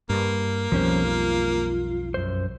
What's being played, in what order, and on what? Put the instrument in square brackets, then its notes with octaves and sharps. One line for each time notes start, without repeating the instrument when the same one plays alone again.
[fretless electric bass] G2 [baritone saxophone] A#3
[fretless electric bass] B1 F2 G3 [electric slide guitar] F3 C#4 C5
[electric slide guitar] F4
F#2 C5